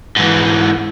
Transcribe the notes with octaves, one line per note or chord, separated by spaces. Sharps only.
G#2 E3